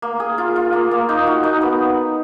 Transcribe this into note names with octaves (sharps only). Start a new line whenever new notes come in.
A#3
G#4
F4
F4
A#3
A#3
D#4
F#4
D#4
B3